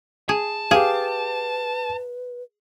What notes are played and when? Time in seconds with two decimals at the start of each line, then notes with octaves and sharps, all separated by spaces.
0.29 G#4 A5
0.71 G4 G#4 B4 F5